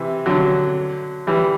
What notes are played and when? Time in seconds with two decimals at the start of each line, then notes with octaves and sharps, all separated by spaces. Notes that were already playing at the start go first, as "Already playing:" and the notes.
Already playing: C3 E3
0.26 D3 F#3
1.27 E3 G3